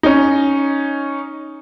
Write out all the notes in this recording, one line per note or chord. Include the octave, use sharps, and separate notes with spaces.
C#4 D#4